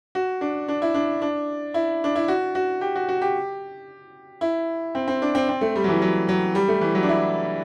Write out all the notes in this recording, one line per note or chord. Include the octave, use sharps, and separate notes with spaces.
F#4
D4
D4
E4
D4
D4
E4
D4
E4
F#4
F#4
G4
F#4
F#4
G4
E4
C4
C4
D4
C4
C4
A3
G3
F#3
E3
F#3
F#3
G3
A3
E3
F#3
D4
E4